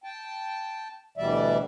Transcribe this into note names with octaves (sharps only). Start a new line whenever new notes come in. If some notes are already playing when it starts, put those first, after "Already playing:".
G5 A5
D2 B2 E3 G3 D5 E5